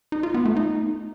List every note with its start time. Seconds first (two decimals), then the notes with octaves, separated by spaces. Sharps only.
0.12 D#4
0.23 F4
0.34 B3
0.45 A3
0.57 D#4